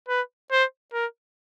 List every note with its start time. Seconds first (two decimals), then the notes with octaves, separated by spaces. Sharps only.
0.09 B4
0.52 C5
0.93 A#4